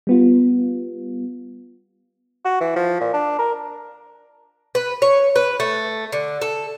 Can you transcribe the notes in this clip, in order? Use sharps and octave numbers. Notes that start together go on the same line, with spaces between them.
G3 B3 F4
F#4
E3
F3
A#2
D4
A#4
B4
C#5
B4
A3
D3
A4